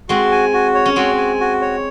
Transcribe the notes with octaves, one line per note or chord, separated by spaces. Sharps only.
G#3 C4 F#4
G#5
F#4
C#5
C#4
G#3 C4 F#4
G#5
F#4
C#5